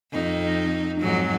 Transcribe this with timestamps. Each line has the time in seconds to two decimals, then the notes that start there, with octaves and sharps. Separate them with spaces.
0.12 F2 D#4
1.01 F2 G#2 F#3